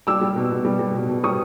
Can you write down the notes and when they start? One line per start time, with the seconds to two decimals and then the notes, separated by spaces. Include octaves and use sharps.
0.07 G3 D6 E6
0.21 G3
0.36 B2
0.51 B2
0.65 G3
0.79 G3
0.94 B2
1.09 B2
1.24 G3 C#6 D#6